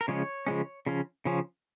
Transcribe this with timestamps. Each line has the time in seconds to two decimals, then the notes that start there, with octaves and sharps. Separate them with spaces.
0.01 A#4
0.08 C#3 F3 G#3 C#4 C#5
0.47 C#3 F3 G#3 C#4
0.86 C#3 F3 C#4
1.25 C#3 F3 C#4